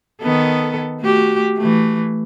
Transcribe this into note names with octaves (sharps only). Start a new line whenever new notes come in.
D#3 B3 A4
A3 F#4 G4
E3 A3